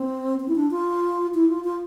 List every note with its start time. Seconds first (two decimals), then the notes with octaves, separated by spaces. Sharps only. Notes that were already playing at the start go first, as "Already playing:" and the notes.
Already playing: C4
0.40 C4
0.48 E4
0.55 D4
0.71 F4
1.34 E4
1.49 F4
1.64 F4